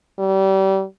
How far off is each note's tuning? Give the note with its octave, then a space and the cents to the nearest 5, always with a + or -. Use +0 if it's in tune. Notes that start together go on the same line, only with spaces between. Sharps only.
G3 -30